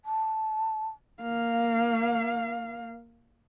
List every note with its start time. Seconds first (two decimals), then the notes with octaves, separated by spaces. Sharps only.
0.05 A5
1.21 A#3 F5